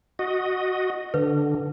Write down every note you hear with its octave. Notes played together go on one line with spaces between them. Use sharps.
F#4 D#5
D3 B4